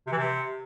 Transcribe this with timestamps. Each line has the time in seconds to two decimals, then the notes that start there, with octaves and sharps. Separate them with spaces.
0.07 C3
0.12 E3
0.17 C3